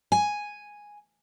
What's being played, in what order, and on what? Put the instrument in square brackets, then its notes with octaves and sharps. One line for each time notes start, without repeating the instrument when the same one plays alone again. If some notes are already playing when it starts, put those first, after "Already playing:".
[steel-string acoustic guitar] G#5